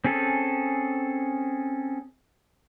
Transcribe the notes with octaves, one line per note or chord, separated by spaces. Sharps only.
C4 C#4 G#4 A4